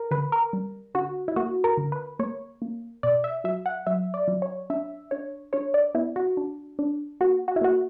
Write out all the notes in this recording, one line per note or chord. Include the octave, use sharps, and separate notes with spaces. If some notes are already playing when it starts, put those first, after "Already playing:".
Already playing: A#4
D3 B4
A#4
G3
D3 F#4
E4
A#3 F#4
A#4
D3
B4
A#3 C#5
A#3
B2 D5
E5
F#3 E5
F#5
F#3 E5
D5
F#3
C#5
D4 E5
D4 C#5
D4 C#5
D5
B3 E4
F#4
D4
D4
A#3 F#4
F#4
E4
A#3 F#4